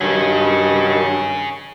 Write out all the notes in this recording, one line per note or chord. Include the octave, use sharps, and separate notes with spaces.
G2 D#3 F#3 C#4 G#4